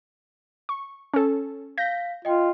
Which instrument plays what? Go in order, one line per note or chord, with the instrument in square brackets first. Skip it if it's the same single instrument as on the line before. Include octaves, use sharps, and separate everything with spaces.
[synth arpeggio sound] C#6
C#4 A4
[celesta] F5 B6 [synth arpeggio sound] G6 A#6
[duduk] F4 [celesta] D#5 G5